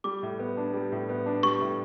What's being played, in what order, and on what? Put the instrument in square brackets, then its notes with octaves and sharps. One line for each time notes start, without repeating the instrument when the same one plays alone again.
[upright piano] G3 [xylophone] D6
[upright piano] A2
B3
D4
G3
A2
B3
D4
[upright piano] G3 [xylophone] C#6
[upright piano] A2